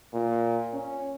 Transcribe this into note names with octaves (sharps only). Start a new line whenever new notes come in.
A#2
C#4